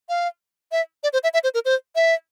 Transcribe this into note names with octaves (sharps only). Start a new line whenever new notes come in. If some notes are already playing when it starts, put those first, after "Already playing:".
F5
E5
D5
C5
E5
E5
C5
A#4
C5
E5